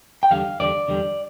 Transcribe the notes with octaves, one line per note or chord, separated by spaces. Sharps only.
G5
E2 D3 G3 F5
E2 D3 G3 D5
E2 D3 G3